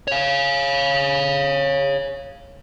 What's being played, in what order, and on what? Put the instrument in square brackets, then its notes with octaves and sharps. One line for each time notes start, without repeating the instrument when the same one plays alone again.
[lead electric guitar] C#5 F5